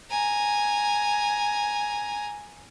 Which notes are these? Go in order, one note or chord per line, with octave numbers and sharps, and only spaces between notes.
G#5 A#5